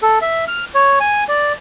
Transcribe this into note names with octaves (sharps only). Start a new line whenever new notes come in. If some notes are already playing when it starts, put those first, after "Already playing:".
A4
E5
F6
C#5
G#5
D5